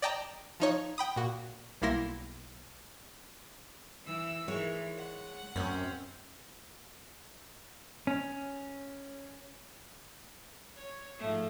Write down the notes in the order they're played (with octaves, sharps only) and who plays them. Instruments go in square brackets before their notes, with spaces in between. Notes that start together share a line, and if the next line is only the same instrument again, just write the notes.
[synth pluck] D5 D#5 G5 A5 A#5
F3 D#4 C#5
G5 B5 D#6
A#2 F#4
B1 G3 A#3 E4 C6 A#6
[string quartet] E3 E6
[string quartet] D#3 E3 [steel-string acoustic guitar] G#3 C#5
[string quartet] F#5
[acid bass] F#2 [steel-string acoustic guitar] C4 C#4
[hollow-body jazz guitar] C#4
[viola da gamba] C#5
G#2 F3 A3